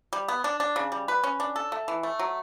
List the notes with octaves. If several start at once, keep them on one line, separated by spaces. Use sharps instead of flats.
G3
B3
D4
D4
C#3
G3
B4
C#4
D4
A4
A3
E3
A3
F#3